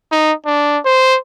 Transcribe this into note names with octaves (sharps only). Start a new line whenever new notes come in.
D#4
D4
C5